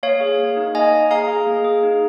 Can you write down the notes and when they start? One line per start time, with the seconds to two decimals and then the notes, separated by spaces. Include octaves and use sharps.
0.03 A#3 C#5 F5
0.21 G#4
0.39 A#3
0.57 D#4
0.75 A#3 D#5 G#5
0.92 A#3
1.11 G#4 F5 A#5
1.28 G#4
1.47 A#3
1.64 G#4
1.83 D#4